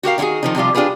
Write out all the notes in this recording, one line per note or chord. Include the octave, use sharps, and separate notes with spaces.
F#4 G4 A#4 F5
D#3 C#4 E4 F#4 G#4
D#3 F3 D#4
C3 F3 G3 F4
D4 F4 G4 G#4 B4